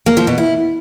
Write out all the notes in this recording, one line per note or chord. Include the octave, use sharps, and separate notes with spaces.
A#3
F3
B2
E4